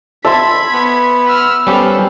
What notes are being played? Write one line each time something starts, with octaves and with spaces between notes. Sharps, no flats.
E5 A5 B5 C6 G#6
B3
E6 F6
G3 B3 C#4 G4 A4 C5